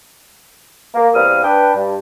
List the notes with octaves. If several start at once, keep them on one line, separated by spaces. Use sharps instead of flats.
A#3
E2 G3 C4 F5 D#6 F6
D4 B4 G5
G2